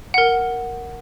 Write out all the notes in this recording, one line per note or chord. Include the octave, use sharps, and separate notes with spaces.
A#4 F#5